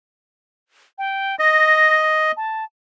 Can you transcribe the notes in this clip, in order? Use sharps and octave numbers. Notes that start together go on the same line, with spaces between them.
G5
D#5 A#6
A5